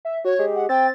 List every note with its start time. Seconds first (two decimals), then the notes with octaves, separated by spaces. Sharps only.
0.05 E5
0.25 F#4 C#5
0.39 G#3 G4
0.55 F#5
0.69 C4 G5 A6